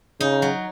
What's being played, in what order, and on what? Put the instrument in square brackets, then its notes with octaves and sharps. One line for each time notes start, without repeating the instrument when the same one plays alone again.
[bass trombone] C#3 [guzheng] D#4
[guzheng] F#3